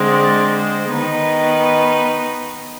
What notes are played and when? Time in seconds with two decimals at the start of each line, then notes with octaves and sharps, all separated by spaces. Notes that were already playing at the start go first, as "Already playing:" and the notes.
Already playing: D3 G#3 C4
0.08 D5
0.50 C5
0.92 D#3 B3 D#4 B4